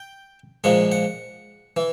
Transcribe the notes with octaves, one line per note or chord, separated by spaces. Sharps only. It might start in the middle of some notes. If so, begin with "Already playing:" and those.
Already playing: G5
A#2 F3 G#3 F#5
F#5
E3